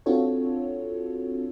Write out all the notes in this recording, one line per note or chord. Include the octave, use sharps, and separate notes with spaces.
C4 D4 F4 F#4 A4 C#5